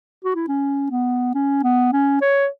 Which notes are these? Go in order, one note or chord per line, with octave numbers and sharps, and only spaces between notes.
F#4
E4
C#4
B3
C#4
B3
C#4
C#5